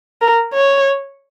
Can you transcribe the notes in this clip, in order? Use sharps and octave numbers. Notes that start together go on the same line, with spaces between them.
A#4
C#5